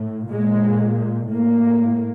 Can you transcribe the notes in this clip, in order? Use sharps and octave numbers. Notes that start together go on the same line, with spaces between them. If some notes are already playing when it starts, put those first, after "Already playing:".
Already playing: A2
A#2 G#3
A2 A#3